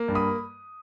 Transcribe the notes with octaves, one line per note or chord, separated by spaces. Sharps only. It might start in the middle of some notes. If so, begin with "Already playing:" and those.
Already playing: A#3
G2
B5 D#6